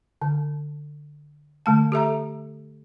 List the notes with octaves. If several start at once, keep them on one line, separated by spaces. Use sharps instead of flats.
D3
D3 A3 A5
G4 A4 E5 A#5